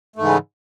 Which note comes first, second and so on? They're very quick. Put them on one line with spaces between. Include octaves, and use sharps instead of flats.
A3 G#2 E3 C#3